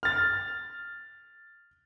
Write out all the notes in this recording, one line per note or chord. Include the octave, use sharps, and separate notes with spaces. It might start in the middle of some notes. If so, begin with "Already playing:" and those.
F6 A6